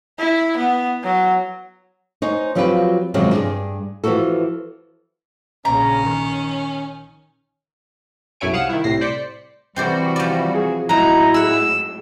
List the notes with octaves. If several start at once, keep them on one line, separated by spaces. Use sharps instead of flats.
E4
B3
F#3
D#4 C5 C#5 G#5
F3 F#3 C4 F4 G4 B4
F#2 C3 D#3 F3 F#3 G#3
G2 D4 G#4
E3 F3 B3 F#4 A4
A#1 C#3 C#4 A#5
D#3
B1 F#2 E4 C#5 G#5 D7
C2 F5 F#5 D#6 C#7 E7
D#3 E4
C2 A2 A#6 C7
C5 D5 B6 C#7
C3 E3 G3 C4 F#4 C5 D5
F3 D5
G#4
A2 F#3 D#4 E4 A#5
G#4 F#5 E6